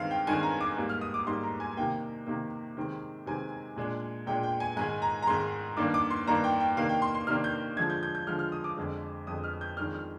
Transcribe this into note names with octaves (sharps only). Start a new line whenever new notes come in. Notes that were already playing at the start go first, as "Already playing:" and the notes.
Already playing: G2 D#3 G#3 C4 F5
G5
G2 D#3 G#3 C4 G#5
A#5
D6
G#2 G3 A#3
F6
D#6
D6
G#2 G3 A#3 C6
A#5
G#5
C3 D#3 A#3 G5
C3 D#3 A#3
C3 D#3 G#3 C4
C3 D#3 G#3 C4 G#5
A#2 G#3 D4
A#2 G#3 D4 G5
G5
G#5
G#2 D#3 G#3 G#5
A#5
A#5
G#2 D#3 G#3 C6
G2 D#3 A#3 D4 D6
D6
C6
G2 D#3 A#3 D4 A#5
G5
G5
C3 D#3 A#3 D4 F5
G5
C6
C6
C3 D#3 A#3 D4 F6
G6
D3 F3 G#3 G#6
G6
G6
G6
D3 F3 G#3 F6
F6
D#6
D6
F2 D3 G#3
F2 D3 G#3 D#6
F6
G6
F2 D#3 G#3 D4 F6
F6